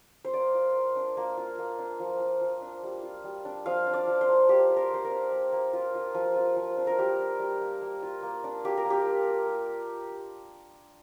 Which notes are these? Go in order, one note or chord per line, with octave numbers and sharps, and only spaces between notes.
C5
A#3 D5
F4
A#3
D4
A#3
F4
A#3
D4
F3
F4
F3
D4
G3
F4
G3
D4
F3 F5
D4
D5
F3
C5
A#3
A#3 G4
F4
A#4
A#3 C5
A#4
D4
A#3
A#3
F4
F4
F3
F4
F3
D4
A#4
G3 G4
D4
G3
A#3
A#3
F4
A#3
D4
A#3 G4
A#4
A#3
G4
F4
F4
A#3